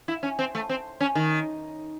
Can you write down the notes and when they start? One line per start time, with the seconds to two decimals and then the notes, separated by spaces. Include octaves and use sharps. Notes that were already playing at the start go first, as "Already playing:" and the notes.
0.08 E4
0.23 C#4
0.39 C4
0.55 A3
0.69 C4
1.01 C#4
1.15 D#3